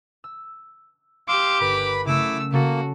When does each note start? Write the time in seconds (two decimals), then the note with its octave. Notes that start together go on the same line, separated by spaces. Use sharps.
0.24 E6
1.28 G4 F5 C6 D6 E6
1.60 G1 A#4 B4 B5
2.06 C#3 F#3 A3 E4 D6 E6
2.53 C#3 A3 A#3 F#4 A4